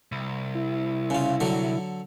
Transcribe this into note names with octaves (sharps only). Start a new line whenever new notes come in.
C2
E4
C#3 F4
D3 F#3